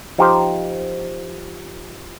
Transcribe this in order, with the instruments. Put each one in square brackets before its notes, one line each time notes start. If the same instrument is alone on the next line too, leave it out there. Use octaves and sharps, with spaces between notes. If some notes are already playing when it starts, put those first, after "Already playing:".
[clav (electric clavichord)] F3 D#4 G4 C5